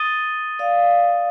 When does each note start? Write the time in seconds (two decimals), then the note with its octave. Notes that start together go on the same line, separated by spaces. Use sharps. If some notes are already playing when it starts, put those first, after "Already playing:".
Already playing: D#6 A6 D#7 G7
0.59 D5 F5